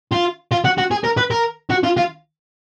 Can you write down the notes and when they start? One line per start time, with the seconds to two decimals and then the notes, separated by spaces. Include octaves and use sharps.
0.12 F4
0.52 F4
0.65 F#4
0.78 F#4
0.91 G#4
1.04 A#4
1.17 B4
1.31 A#4
1.70 F#4
1.83 F4
1.97 F4